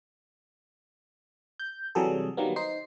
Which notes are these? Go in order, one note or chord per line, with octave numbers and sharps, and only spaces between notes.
G6
C3 E3 F#3 G3 G#4 A4
D#3 F#3 G3 A#3 B3
D#4 C5 C7